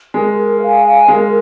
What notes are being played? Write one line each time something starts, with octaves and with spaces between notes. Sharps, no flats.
G#3 A#4
F5 G#5
G#3 A#4